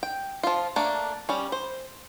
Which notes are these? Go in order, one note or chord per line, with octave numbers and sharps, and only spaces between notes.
G5
F3 F4
A3 A#3 D4
G3 C#4
C5